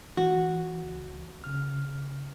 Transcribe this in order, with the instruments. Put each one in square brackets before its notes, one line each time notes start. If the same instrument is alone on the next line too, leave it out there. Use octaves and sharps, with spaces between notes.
[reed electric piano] E3 [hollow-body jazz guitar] F#4
[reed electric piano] C#2
C#3 F6